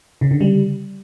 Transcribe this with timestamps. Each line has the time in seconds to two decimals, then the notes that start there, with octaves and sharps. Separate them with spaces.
0.21 C#3
0.31 D3
0.41 G3